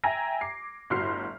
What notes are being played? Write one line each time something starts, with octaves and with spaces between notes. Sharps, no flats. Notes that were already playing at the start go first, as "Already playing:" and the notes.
E5 G5 G#5 A#5 G#6 A#6
D6 C7
G1 A2 F#4 C6 F6 C7